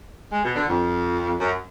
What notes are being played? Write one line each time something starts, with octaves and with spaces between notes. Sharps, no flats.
G#3
B2
D3
F2
F#2